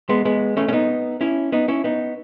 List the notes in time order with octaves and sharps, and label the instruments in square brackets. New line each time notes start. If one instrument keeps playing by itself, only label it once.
[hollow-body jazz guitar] G#3 B3
G#3 B3
A3 C#4
C#4
B3 D#4
C#4 E4
B3 D#4
C#4 E4
B3 D#4